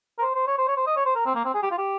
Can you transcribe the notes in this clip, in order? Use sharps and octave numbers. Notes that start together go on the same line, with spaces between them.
A#4
C5
C5
C#5
C5
C#5
C5
D#5
C#5
C5
A#4
C4
A#3
C4
G#4
G4
F4
G4